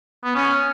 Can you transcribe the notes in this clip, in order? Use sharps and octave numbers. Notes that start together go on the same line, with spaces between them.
B3
C#4